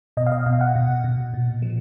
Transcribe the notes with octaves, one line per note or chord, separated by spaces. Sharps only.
B2 D#5
F5
D#5
B2 F5
F#5
B2
B2
A#2
F3